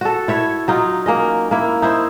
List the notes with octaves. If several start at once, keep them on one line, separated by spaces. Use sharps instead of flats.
F#4 A4
E4 C#5 E5
F#3 D#4 F4
A#3 C#4 D#5
A#3 E4
D#4 E4 C5